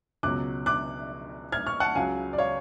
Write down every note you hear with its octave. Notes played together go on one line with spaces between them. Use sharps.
C#2 B2 F#3 D6 F#6
D6 F#6
F6 G#6
C#6 F6
F#5 A5
C#2 C#3 F#3 F5 G#5
D5
C#5 F5